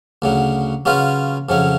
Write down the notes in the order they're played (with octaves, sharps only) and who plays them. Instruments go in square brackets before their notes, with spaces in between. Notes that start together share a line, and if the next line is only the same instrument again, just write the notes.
[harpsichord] D2 C#3 F#3
C#3 F#3 C#4 F4 B4
F2 C#3 F#3 C#4